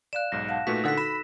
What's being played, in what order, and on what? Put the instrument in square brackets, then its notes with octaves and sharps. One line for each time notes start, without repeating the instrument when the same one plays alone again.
[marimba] D5 F5 [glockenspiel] F#6 E7
[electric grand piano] B1 G#2 [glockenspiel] A#6
[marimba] F5 F#5 A5
[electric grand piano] A#2 A3 F#4 [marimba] D#4 B4 [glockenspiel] B6
[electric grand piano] A#2 D3 F#5 [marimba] D#4 F#4 A4 [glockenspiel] E6 B6
[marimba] F#4 [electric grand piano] B5 [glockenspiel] E7